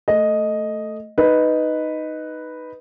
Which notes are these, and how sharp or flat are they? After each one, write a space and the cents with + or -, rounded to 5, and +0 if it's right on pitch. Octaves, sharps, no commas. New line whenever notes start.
A3 +5 D#5 +0
D#4 +0 B4 +0